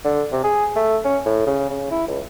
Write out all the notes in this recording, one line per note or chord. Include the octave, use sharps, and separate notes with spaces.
D3
C3
G#4
A3
C#4
A2
C#3
C#3
E4
C#2